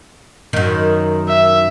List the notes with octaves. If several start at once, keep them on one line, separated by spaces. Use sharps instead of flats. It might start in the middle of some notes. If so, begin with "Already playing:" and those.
F#2 D#3
E5